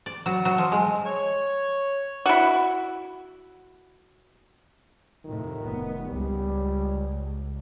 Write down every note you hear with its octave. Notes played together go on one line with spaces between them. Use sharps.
D5
F#3
F#3
F3
G#3
C#5
E4 F#4
F2 A2 C3 D#3
F1 B3
C#2 G3